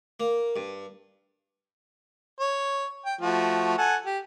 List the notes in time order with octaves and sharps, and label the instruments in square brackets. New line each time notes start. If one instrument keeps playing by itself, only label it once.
[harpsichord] A#3
G2
[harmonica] C#5
G5
F3 A3 F#4
A4 F#5 G#5
G4